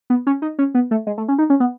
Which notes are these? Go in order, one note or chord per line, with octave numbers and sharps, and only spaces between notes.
B3
C#4
D#4
C#4
B3
A3
G#3
A3
C#4
D#4
C#4
B3